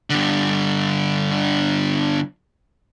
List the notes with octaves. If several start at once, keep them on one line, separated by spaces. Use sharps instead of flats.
G2 D3